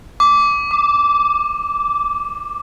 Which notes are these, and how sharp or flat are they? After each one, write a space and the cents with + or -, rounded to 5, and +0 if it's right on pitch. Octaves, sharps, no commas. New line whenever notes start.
D6 -15
D6 +15